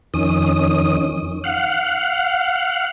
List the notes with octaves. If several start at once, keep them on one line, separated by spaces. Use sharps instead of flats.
F2 D#3 C#4 D#6
F5 F#5